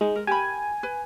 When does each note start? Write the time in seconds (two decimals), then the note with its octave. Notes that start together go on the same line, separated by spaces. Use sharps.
0.01 G#3 D#4
0.16 A#4
0.27 G4 A#4 G#5 B5
0.83 B4